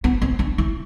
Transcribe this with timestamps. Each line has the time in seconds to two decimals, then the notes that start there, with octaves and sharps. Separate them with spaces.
0.04 B3
0.22 C4
0.39 D4
0.58 E4